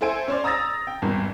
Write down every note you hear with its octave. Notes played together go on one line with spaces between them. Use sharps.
E4 A4 C5 G#5 D7
C#4 C5 D5
A#5 D#6 E6 A6 A#6
G5
G#1 E2 G2